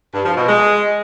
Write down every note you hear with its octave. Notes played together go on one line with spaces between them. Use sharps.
G2
F3
B2
G#3